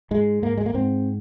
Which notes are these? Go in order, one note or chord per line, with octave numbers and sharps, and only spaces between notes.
G#2 G#3
G#2 A#3
G#3
A#3
G#2 C4